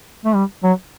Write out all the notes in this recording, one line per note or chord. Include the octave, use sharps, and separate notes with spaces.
A3
G3
F#3